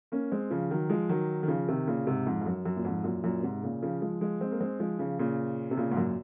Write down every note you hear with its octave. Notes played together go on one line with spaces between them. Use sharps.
A#3 C#4
G#3 C4
C#3 F3
D#3 F#3
F3 G#3
D#3 F#3
D#3
C#3 F3
C3 D#3
A#2 C#3
G#2 C3
F2 G#2
F2
F#2
F#2
A#2
F2 G#2
F#2 A#2
F#2 A#2
G#2 C3
A#2 C#3
C#3 F3
F3 G#3
F3 G#3
G#3 C4
A#3
G#3 C4
F3 G#3
C#3 F3
A#2 C#3
C3
A#2 C#3
G#2
F#2 A#2